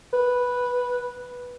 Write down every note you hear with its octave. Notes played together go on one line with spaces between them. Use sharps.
B4